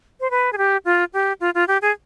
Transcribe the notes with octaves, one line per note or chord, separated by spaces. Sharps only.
C5
B4
G#4
G4
F4
G4
F4
F4
G4
G#4